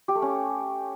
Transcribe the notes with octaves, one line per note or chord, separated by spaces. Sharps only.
G4
A3
C#4